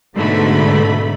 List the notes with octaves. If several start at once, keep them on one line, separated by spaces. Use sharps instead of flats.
G#2 B2 D3 A3 B5